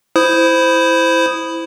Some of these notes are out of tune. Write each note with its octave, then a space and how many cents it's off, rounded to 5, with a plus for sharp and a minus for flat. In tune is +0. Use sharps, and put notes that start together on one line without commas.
E4 +0 C5 -15 D#6 -5